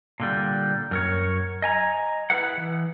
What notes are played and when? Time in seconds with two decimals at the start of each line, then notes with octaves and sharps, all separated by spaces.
0.20 A#2 D3 G3
0.91 F#2 A#4 C#5
1.62 D#5 G#5 A#5
2.30 E4 G#4 B4 E5 F#5
2.57 E3